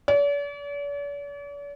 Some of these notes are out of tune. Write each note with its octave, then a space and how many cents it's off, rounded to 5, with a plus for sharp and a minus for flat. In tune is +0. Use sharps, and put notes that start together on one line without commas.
D5 -45